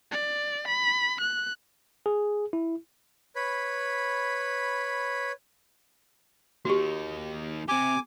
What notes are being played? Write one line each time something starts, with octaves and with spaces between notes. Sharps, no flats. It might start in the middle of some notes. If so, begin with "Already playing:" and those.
D5
B5
F#6
G#4
E4
B4 C#5 B5
A#3 D#4 F#4 G4
C4 G4 G#5 D6